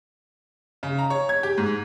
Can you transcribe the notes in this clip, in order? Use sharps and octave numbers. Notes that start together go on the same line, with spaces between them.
C#3
A#5
C#5
G#6
G4
G#2